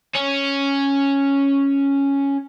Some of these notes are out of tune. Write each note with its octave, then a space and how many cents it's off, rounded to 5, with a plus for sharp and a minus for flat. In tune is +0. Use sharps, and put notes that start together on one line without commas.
C#4 +0